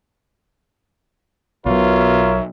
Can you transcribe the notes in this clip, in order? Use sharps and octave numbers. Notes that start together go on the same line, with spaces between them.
B1 B2 F#3 F4 A#4 C#5 E5